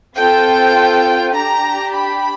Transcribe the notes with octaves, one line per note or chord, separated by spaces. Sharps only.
C4 F4 A4 G5
D4 G4 A#5
B5